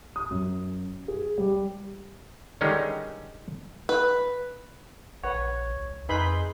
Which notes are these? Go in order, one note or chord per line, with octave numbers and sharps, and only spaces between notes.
D#6
F#2
G#4
G3
D3 D#3 G3 G#3 C#4 D#4
B4
A#1 B4 C#5 F#5
C#2
F2 D#4 G#4 B4 B5 C6 G6